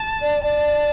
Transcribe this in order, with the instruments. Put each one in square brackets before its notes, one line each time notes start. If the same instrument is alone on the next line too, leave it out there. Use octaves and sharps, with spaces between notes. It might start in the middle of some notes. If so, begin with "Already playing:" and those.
Already playing: [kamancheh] A5
[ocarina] D5
[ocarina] D5 [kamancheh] A5